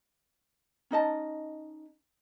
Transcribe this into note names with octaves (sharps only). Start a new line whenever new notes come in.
C#4 D#4 D#5 A5